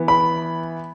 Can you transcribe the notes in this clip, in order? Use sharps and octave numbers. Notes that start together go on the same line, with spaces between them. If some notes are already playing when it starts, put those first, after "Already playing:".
Already playing: E3 B3
B5